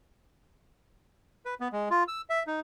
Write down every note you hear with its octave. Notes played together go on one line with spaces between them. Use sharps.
B4
B3
G#3
F4
E6
E5
D#4